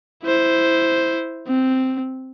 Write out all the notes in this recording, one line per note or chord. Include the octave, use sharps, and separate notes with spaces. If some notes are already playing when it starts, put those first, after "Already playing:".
E4 C5
C4